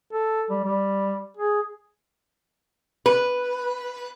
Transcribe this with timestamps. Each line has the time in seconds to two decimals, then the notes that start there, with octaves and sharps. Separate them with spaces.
0.13 A4
0.50 G3
0.64 G3
1.37 G#4
3.06 B4